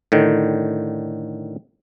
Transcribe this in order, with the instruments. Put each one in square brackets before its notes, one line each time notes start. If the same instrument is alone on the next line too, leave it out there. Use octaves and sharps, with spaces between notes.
[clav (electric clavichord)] A2 D3 D#3